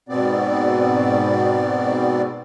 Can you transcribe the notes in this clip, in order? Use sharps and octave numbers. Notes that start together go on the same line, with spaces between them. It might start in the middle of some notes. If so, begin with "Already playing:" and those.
G#2 B2 B3 C4 D5